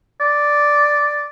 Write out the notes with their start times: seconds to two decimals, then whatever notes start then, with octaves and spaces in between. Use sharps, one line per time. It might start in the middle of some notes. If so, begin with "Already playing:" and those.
0.21 D5